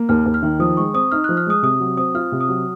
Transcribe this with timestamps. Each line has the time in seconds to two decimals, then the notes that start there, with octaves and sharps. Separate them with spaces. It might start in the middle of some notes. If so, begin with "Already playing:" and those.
Already playing: A#3
0.09 D#2 F6
0.26 D#2
0.34 F6
0.43 D#3
0.59 F3 D#6
0.77 G#3 C#6
0.94 C4 D#6
1.12 D#4 F6
1.24 F#6
1.29 F3
1.37 F6
1.47 G#3 D#6
1.63 C3 D#6
1.80 F#3
1.97 C4 D#6
2.15 F4 F6
2.32 C3
2.41 D#6
2.49 F#3